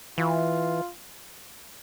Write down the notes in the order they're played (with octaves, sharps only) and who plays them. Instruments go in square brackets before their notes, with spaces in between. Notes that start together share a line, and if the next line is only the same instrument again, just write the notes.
[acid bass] E3 [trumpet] F4